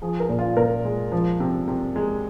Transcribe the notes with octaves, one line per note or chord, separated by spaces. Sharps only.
F3 G#4
A#4
A#2
F4
A#2 A#4
G#3
F3
C3
C3
G#3